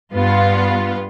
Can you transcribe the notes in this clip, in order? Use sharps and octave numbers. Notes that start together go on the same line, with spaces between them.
G2 B3 F4